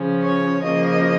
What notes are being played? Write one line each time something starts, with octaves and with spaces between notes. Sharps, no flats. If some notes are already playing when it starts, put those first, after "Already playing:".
Already playing: C#3 F3 C#4
C#5
C#3 F3 A#3 D#5